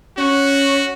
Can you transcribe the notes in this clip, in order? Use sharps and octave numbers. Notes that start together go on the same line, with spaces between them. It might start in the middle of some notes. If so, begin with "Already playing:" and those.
C#4 F#4